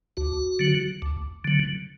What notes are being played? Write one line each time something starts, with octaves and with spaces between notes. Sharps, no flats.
D2 F#4
D3 F#3
D2
D3 F#3